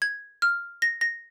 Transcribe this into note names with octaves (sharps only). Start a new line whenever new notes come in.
G#6
F6
A#6
A#6